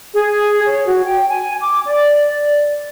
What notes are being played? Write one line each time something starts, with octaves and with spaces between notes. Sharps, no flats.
G#4
C#5
F#4
G5
G#5
D6
D5